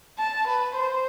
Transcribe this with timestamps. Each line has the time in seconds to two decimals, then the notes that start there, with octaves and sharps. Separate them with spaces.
0.19 A5
0.48 B4
0.77 C5